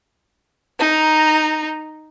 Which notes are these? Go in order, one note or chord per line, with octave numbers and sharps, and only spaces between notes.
D#4 A#5